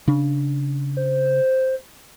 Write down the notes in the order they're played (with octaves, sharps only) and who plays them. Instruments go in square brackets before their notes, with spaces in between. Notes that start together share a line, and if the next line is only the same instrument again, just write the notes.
[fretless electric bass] C#3 D4
[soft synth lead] C5